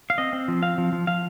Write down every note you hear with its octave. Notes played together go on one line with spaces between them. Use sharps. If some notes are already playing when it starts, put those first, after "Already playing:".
F5
C4 D#5
C4
F3
C4 F5
F3
F3
F3 F5